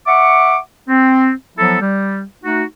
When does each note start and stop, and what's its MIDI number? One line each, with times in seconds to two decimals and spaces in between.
0.07 0.57 76
0.07 0.57 78
0.07 0.57 85
0.07 0.57 86
0.88 1.31 60
1.57 1.77 53
1.57 1.77 54
1.57 1.77 59
1.57 1.77 64
1.57 1.77 69
1.80 2.23 55
2.43 2.63 57
2.43 2.63 63
2.43 2.63 66